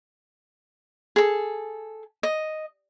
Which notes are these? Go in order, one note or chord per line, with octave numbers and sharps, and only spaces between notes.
G#4 A4
D#5